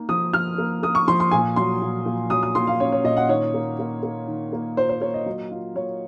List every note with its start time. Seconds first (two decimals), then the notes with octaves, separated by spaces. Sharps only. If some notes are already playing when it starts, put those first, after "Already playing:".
Already playing: A#3 D#4
0.09 F3 D#6
0.33 F3 F6
0.58 A#3
0.83 A#3 D#6
0.95 C#6
1.08 F3 C6
1.20 C6
1.31 A#2 G#5
1.56 F#3 C6
1.82 A#2
2.06 A#2
2.30 F#3 D#6
2.43 D#6
2.55 A#2 C6
2.67 F5
2.80 C#4 C#5
2.92 C#5
3.04 A#2 D#5
3.17 F#5
3.29 D#3 C#5
3.54 A#3
3.79 A#3
4.03 A#3
4.28 D#3
4.52 A#3
4.77 F4 C5
4.89 C5
5.01 A#3 C#5
5.14 D#5
5.26 F#3
5.51 F4
5.75 F#3 C#5